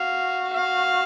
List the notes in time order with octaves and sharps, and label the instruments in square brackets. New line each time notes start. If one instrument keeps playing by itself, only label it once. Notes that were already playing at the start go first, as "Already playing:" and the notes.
Already playing: [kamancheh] F#4 [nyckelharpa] F5
[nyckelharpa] F5